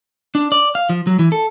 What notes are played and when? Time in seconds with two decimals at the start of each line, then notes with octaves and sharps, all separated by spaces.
0.35 D4
0.52 D5
0.75 F5
0.89 F3
1.07 F#3
1.19 E3
1.32 A4